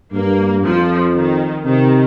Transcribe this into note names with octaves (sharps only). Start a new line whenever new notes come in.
G2 A#3
F2 F3
D#3
C3 D#3